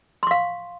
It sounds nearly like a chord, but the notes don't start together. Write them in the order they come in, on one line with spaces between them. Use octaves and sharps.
C6 C#6 F5